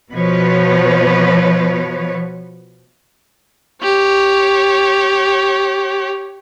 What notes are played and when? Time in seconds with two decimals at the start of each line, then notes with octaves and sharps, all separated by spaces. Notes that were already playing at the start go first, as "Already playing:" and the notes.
0.12 B2 F3 B4 C#5
3.82 G4 C#5